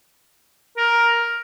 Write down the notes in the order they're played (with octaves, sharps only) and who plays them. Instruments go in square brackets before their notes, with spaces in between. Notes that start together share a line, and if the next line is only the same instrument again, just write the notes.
[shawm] A#4